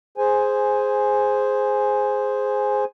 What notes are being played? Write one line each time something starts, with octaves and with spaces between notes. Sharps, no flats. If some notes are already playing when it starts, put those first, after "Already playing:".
G#4 C5 G#5